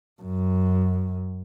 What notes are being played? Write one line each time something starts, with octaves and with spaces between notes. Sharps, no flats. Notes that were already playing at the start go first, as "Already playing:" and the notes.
F#2